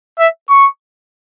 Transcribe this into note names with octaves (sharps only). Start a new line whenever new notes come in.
E5
C#6